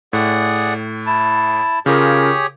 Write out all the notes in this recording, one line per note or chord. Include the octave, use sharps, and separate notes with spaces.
A2 G#4 D5 F#5
E4 A5
C#3 F4 G4 G#4 A#4 C#5